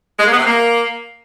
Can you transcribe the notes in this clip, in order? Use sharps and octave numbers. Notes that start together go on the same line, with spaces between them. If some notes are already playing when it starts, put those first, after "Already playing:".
G#3
A#3
B3
C3
A#3